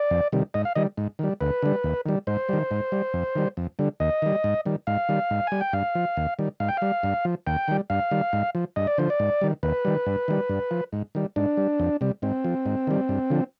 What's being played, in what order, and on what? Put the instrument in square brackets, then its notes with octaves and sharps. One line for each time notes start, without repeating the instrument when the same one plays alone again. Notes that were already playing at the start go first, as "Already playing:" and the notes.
Already playing: [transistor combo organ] D5
F2
C3 D#3 G3
G#2 D#5
F5
D#3 G3 D#5
G#2
D#3 G3
D2 B4
D3 G3
D#2
D#3 G3
G#2 C5
D#3 G3
G#2
G3
F2
D#3 G3
F2
D3 G3
D#2 D#5
D#3 G3
G#2
D#3 G3
G#2 F5
D#3 G3
G#2
G3 G#5
G5
G2 F5
F3
D#2
D#3 G3
G#2 F5
G5
G3 F5
G2
F3
D#2 G5
D#3 G3
G2 F5
D#3 G3
G#2
F3
G2 D#5
D5
D3 F3 C5
D5
G#2
D#3 G3
D#2 B4
D#3 G3
G2
D#3 G3
G2
F3
G#2
D#3 G3
G#2 D4
G3
F2
C3 G3
G#2 C4
F3
G#2
D#3 G3
G2
D3 F3